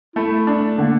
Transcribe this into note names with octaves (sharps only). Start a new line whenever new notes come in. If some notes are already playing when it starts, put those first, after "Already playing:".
A3 E4
D4
D3 A#3